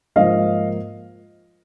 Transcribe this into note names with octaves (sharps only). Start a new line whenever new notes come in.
G#2 F3 A#3 D#5 F5